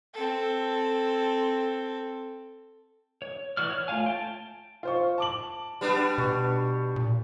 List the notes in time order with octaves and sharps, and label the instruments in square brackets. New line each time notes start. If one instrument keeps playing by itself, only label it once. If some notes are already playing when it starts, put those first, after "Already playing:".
[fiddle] C4 A4
[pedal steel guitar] C#5
E3 F#4 D5 F6
C#5
A3 F4 C#5 F5 G#5
G5 A5
[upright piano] F4 C5 C#6
A5 D6 F#7
[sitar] G3 B3 D4
[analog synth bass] B2 [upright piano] C#6
[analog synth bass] A#2